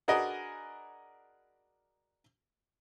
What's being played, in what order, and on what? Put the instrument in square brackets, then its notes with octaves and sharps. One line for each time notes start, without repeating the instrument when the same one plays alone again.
[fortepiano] D4 F#4 G#4 A#4 B4 D#5